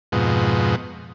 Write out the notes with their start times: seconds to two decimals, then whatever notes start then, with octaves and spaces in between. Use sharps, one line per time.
0.12 F2 G#2 B2